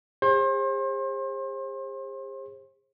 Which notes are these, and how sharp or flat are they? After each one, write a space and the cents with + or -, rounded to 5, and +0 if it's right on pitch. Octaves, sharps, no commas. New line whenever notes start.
G#4 -45 C5 +35